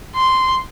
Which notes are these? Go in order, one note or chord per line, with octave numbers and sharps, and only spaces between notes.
C6